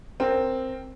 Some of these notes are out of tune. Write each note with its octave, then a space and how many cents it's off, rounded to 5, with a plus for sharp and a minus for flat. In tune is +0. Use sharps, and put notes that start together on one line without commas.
C4 +0 A#4 +0